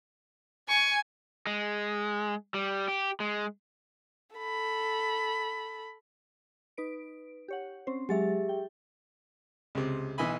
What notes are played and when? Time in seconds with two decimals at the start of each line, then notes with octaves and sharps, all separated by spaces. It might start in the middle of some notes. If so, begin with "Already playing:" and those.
0.69 G#5 C#6
1.47 G#3
2.54 G3
2.88 G4
3.20 G#3
4.36 A4 B5
6.77 D#4 B4 D7
7.48 G4 C#5 F#5
7.87 C4 C#4 C5
8.09 F#3 G#3 G4 G#4 E5 A6
8.49 G5
9.75 C#2 C3
10.18 B1 E3 D#5 E5 G#5 B5